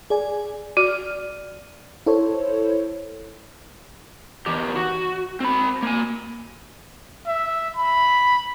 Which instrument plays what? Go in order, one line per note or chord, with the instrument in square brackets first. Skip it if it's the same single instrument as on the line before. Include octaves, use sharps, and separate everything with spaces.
[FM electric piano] G#4 D5 G#5
[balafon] F#4 [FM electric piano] D5 F6
[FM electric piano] E4 A4 C5 C#5
[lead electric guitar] E2 G4
F#4
C4 B5
A#3 G#5
[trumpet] E5
B5